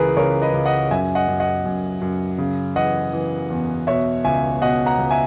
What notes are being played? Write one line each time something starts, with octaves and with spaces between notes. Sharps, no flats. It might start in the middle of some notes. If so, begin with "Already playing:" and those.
Already playing: C#2 E3 G#4 A#4 B4
C#2 A#4 C#5
B4 D#5
C#2
D#5 F#5
F#2 E5 G#5
D#5 F#5
F#2
D#5 F#5
F#2
F#2
C#3
E3 D#5 F#5
E3
E2
B2 C#5 E5
C#2 E5 G#5
B2 D#5 F#5
F#5 A#5
C#2
E5 G#5